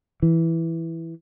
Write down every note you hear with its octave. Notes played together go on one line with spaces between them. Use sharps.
E3